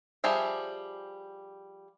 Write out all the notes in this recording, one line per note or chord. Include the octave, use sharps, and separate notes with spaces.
F3 G3 G#4 E5